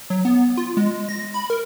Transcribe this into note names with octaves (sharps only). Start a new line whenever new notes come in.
F#3
B3
F4
G#3
A#6
B5
A#4